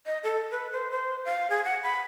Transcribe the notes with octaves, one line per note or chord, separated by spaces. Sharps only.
D#5
A4
B4
C5
C5
F5
G#4
F#5
B5